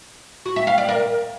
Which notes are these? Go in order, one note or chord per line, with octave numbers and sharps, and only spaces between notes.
F#4
E5
F5
D5
A#4